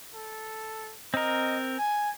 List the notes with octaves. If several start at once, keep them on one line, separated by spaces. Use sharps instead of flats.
A4
C4 A#4 D#5
G#5